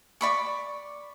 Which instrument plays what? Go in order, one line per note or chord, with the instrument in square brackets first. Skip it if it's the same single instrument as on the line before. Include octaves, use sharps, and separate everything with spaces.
[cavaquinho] D5 B5 C#6